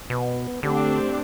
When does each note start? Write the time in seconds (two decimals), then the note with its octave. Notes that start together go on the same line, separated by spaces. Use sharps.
0.10 B2 B3
0.63 D3 A3 C4 D4 G4